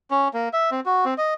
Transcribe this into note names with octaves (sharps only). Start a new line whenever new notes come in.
C#4
A#3
E5
C4
F#4
C4
D#5